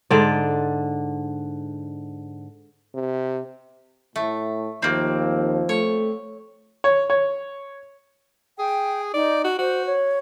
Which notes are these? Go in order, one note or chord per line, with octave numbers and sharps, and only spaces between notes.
G#2 D3 D5
C3
A2 A3
D#2 F3 A#3 C4
A3 C#5
C#5
C#5
G#4 G5
D#4 D5
F#4
F#4 C5
C#5